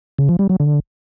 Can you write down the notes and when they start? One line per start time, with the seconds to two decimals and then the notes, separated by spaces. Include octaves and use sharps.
0.18 C#3
0.29 F3
0.39 G3
0.49 F#3
0.60 D3